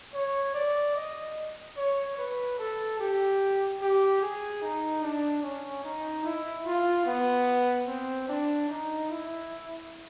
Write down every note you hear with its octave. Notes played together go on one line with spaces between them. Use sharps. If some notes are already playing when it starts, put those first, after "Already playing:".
C#5
D5
D#5
C#5
B4
A4
G4
G4
G#4
D#4
D4
C#4
D#4
E4
F4
B3
C4
D4
D#4
E4